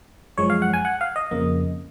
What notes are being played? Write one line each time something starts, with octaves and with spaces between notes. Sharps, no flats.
F#2 F3 G#3 C#5
F5
F#5
G#5
F#5
F5
D#5
F2 C#3 F3 A#3